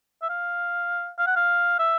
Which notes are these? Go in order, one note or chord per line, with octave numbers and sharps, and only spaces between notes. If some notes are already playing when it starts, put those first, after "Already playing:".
E5
F5
F5
F#5
F5
E5